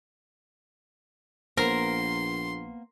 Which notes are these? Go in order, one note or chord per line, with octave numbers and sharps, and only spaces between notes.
A#1 A#3 B3 A#4 C5 C6